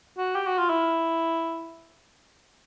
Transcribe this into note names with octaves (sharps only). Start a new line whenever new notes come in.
F#4
G4
F#4
F4
E4